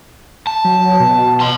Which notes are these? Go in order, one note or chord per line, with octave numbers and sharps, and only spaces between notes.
A5
F#3
B2
A5 C6